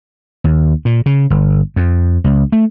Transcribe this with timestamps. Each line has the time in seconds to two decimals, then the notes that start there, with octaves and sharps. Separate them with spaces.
0.44 D#2
0.85 A#2
1.06 C#3
1.30 G1
1.76 F2
2.24 C#2
2.52 A3